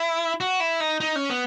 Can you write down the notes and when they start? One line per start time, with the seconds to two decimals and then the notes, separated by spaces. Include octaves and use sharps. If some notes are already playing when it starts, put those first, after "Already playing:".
Already playing: E4
0.40 F#4
0.60 E4
0.80 D#4
1.00 D#4
1.16 C#4
1.30 B3